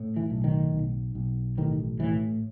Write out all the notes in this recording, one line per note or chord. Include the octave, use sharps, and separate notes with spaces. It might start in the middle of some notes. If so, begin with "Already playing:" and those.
Already playing: A2
E3
B1
D#3
B1
B1
A1 D#3
A2 E3